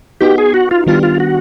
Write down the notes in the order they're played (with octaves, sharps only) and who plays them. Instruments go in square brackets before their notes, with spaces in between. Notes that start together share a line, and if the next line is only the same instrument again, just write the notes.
[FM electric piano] B3 D#4 F#4 [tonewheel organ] G4
[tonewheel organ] G#4
F#4
F4
[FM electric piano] D#3 G3 B3 D4 G4 [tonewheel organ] F4
[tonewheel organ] F4
F#4